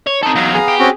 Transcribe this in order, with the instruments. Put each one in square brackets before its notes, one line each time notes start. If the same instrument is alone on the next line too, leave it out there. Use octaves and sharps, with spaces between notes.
[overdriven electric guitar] C#5
[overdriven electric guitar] C3 A4 [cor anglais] D#4
[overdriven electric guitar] E2 F#3 [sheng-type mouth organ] F5 A#5
[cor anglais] B3 [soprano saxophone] G#4
[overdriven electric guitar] G4
[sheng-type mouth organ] C4 C#4 F#4